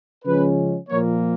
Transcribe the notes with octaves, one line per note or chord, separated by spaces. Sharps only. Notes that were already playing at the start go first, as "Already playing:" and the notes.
C#3 F3 G#3 C#4 B4
A#2 F3 A#3 C#5